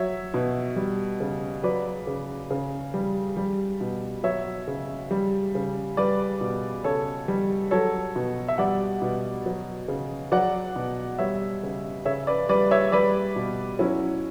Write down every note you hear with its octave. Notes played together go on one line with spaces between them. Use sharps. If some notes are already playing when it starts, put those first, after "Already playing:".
Already playing: F#3 C#5 E5
B2
G3
C#3
F#3 B4 D5
C#3
C#3
G3
G3
B2
F#3 C#5 E5
C#3
G3
C#3
G3 B4 D5
B2
C#3 A4 C#5
G3
F#3 A4 C#5
B2
E5
G3 D5 F#5
B2
F#3
C#3
F#3 D5 F#5
B2
G3 C#5 E5
C#3
C#3 C#5 E5
B4 D5
G3 B4 D5
C#5 E5
G3 B4 D5
B2
F#3 C#4 E4